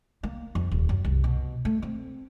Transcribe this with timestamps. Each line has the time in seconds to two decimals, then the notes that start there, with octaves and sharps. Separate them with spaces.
0.23 A#3
0.55 F2
0.72 D#1
0.89 F#2
1.04 C2
1.24 B2
1.65 A3
1.82 C4